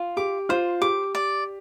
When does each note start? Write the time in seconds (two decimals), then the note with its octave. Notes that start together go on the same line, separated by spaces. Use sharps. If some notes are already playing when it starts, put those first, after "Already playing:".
Already playing: F4
0.17 G4 D6
0.49 F4 C5
0.81 G4 D6
1.15 D5